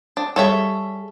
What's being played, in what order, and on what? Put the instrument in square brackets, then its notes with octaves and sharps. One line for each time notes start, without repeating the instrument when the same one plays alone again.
[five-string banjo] D4
[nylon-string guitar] G3 G#4 [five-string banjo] A4 C#5 E5